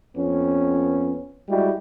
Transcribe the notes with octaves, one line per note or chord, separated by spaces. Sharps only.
F2 B3 C#4
G3 G#3 E4 F#4